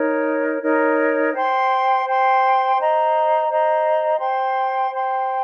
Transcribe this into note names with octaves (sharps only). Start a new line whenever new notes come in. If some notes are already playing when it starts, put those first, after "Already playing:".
Already playing: D#4 A#4 C#5
D#4 A#4 C#5
C5 G5 C6
C5 G5 C6
C5 D#5 A#5
C5 D#5 A#5
C5 G5 C6
C5 G5 C6